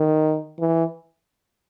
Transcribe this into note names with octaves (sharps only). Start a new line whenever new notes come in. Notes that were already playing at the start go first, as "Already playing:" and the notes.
Already playing: D#3
E3